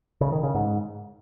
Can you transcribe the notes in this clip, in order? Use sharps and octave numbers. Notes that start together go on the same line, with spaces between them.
C#3
D#3
C#3
G#2